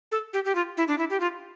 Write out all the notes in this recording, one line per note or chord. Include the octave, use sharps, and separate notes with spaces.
A4
G4
G4
F4
E4
D4
E4
G4
F4